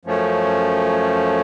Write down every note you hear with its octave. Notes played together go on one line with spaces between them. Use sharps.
F#2 F3 A3 C#4